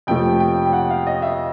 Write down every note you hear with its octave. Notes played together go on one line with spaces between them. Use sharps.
F2 C3 F3 A3 G5
G5
G5
F#5
F5
D#5
E5